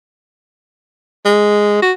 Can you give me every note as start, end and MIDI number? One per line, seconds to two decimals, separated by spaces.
1.25 1.82 56
1.82 1.92 66